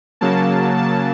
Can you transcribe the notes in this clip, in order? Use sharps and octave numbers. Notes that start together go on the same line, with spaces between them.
C#3 F#3 A#3 A5
A5